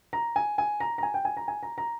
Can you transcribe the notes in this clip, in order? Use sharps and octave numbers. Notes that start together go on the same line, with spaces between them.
A#5
G#5
G#5
A#5
A#5
G#5
G5
G#5
A#5
G#5
A#5
A#5